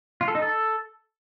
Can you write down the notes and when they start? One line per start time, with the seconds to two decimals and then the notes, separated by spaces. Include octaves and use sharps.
0.21 F4
0.28 A4
0.35 D#4
0.42 A4